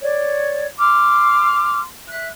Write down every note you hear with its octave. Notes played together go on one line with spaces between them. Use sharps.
C#5 D5
C6 D6 F6
E5 F#6